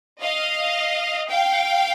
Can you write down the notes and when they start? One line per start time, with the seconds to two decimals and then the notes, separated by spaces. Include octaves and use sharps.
0.21 D#5 F5
1.29 F5 G5